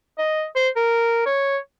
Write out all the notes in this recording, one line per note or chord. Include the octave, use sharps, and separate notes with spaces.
D#5
C5
A#4
C#5